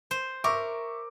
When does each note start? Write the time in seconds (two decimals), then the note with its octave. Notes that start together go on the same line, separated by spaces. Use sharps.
0.11 C5
0.44 A#4 E5 C#6 D6